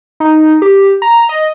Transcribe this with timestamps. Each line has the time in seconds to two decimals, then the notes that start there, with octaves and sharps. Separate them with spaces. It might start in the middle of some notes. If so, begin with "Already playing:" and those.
0.20 D#4
0.62 G4
1.02 A#5
1.29 D#5